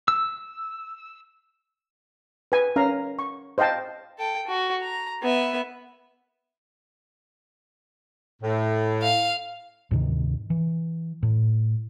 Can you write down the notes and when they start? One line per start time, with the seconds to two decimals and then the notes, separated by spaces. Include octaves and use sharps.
0.08 E6
2.52 B4 G#5
2.76 C#4 A#4 F5 A#5
3.19 C#6
3.58 C5 D#5 F5 G5 A5
4.19 A4 G5
4.47 F#4
4.82 A#5
5.22 B3 E5
8.42 A2
9.03 F5
9.91 D2 G#2 C3 D#3
10.50 E3
11.23 A2